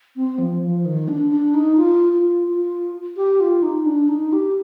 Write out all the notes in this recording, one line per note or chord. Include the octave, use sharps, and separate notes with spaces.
C4
F3
F3
D#3
D4
D4
D#4
F4
F4
F4
G4
F4
D#4
D4
D#4
G4